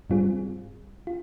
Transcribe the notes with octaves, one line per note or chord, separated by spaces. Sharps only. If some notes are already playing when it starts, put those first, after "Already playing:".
G#2 G3 C4 F4 G#4
F4